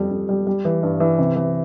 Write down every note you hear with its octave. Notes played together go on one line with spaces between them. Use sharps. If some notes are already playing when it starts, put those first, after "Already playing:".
Already playing: F2 G3
F2
G3
G3
E3
G2
E3
C3
E3